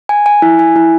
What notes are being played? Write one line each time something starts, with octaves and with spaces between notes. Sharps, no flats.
G#5
G#5
E4
G#5
E4